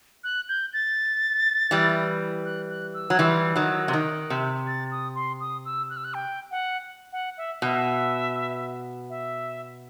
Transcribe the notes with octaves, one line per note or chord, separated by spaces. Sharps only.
F#6
G6
A6
E3 G3
F#6
F#6
E6
F#3
E3 G3 C6
D#3 F#3
E6
C3
D#3 F#6
C3
A6
D#6
C6
D#6
E6
F#6
E6
F#6
G5
F#5
F#5
E5
B2 E5
E5